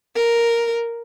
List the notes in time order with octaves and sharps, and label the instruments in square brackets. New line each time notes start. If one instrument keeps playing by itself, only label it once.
[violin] A#4